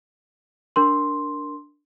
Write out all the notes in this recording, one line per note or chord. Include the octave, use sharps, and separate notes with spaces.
D4 A#4 C6